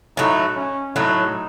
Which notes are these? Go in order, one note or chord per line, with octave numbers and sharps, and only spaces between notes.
A2 F#3 A3 D#4
C#4
A2 F#3 A3 D#4